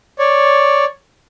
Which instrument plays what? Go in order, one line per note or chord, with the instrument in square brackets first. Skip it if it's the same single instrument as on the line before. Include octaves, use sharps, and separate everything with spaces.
[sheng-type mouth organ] C#5 D5